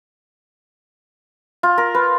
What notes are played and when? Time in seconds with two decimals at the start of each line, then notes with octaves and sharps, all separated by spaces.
1.63 F4
1.78 A#4
1.95 B4